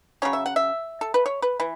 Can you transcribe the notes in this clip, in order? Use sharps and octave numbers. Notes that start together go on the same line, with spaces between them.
C#3 F#3 C#4 C#5
E5
F#5
E5
A4
B4
C#5
B4
E3 B4